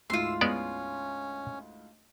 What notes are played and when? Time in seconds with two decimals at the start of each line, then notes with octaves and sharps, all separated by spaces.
0.10 D2 G#2 E4 F4 C6 E6
0.41 G#3 B3 C#4 D5